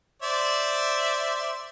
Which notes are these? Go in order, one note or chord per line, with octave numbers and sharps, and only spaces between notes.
C5 D5 E5